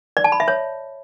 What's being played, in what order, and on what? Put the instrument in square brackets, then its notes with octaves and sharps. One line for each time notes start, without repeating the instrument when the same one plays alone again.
[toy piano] D5
A5
B5
E5
C#5